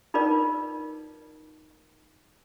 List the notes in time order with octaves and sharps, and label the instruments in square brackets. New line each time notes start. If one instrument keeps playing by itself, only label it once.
[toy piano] D#4 F4 A#4 B4 D5